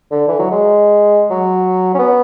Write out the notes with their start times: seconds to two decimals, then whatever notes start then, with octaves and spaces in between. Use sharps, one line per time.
0.11 D3
0.28 E3
0.39 F#3
0.51 G#3
1.30 F#3
1.94 C#4
1.99 B3